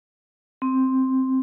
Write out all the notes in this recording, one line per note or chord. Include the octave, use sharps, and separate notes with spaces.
C4